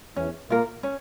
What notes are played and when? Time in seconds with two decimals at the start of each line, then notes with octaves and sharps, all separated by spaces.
0.16 E2 E3 C#4
0.50 A#2 A#3 F4 A#4
0.83 C#4